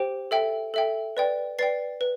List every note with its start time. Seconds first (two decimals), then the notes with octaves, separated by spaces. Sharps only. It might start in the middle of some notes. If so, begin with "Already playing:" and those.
Already playing: G4 C5 G5 D7
0.31 A4 E5 G5
0.74 A4 E5 G5
1.17 B4 D5 G5
1.59 B4 D5 G5 A6 C7
2.01 B4